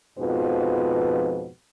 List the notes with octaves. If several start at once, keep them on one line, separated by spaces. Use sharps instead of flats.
F2 G#2 B2 F3 B4